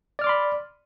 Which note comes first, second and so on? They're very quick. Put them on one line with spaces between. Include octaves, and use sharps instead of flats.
D5 F6 D6 C6 B5